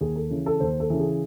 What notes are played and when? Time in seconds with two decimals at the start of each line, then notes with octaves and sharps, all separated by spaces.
0.01 D#2 G#4
0.16 A4
0.31 C#3 E3
0.46 A4
0.60 D#2 C5
0.80 A4
0.90 C#3 E3
1.00 G#4